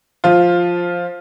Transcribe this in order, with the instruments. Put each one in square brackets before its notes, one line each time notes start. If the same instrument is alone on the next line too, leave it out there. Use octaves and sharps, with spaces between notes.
[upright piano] F3 F4